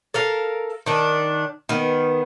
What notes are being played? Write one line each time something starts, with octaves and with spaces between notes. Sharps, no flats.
A4 A#4 F5
D#3 D4
D#3 B3